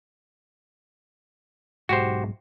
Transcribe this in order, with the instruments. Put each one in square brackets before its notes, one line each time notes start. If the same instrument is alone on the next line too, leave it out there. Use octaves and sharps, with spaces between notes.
[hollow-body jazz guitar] B1 G#2 G#3 [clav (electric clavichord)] F#4 G4 C5